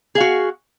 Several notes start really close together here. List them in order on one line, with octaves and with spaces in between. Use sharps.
G#4 F5 F#4